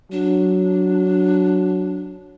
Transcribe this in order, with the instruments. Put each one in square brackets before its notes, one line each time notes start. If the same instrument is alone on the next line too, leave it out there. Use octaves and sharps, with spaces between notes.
[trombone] F#3 [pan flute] D4